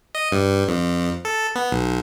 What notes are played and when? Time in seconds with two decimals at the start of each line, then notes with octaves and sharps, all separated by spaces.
0.15 D#5
0.32 G2
0.68 F2
1.25 A4
1.55 B3
1.72 B1